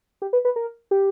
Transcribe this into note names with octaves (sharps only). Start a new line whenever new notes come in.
G4
B4
B4
A#4
G4